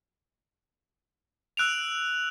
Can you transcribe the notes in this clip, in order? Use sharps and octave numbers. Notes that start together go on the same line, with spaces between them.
E6 F#6 D7 F7